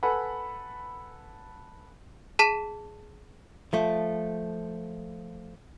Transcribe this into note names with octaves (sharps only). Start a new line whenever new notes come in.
A4 B4 F#5 G#5 B5
G#4 A5 B6 D#7 E7
F3 A3